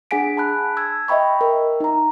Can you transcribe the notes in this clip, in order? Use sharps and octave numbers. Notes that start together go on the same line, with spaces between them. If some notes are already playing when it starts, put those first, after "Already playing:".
D4 G#4 F#5 G#5 B6 D7
A5 B5 F#6
E6 G#6
D#5 E5 G5 B5 C#6
A#4
D#4 A#5